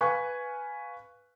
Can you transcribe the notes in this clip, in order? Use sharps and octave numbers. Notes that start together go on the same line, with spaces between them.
B4 F5 G#5 C#6 F#6